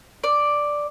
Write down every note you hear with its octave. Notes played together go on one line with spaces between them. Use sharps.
D5